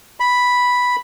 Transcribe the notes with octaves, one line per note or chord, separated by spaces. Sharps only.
B5